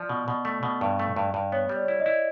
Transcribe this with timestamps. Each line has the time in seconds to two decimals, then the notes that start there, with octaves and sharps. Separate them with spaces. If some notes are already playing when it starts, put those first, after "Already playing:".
Already playing: F3 D5
0.09 B2
0.28 B2
0.45 A3
0.63 B2
0.81 G2
0.99 A3
1.16 G2
1.34 G2
1.52 B3 C#5
1.69 G3
1.76 D5
1.83 C#5
1.88 E4 D5
2.00 D#5
2.06 E4